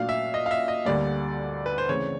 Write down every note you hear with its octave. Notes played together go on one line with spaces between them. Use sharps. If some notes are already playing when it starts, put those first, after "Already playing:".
Already playing: A#2 F#3 A3 D4 F#4 F5
E5
D#5
F5
E5
D#5
D2 D3 G3 A#3 D5
B4
C5
C#3 E3 A3 C4 C#5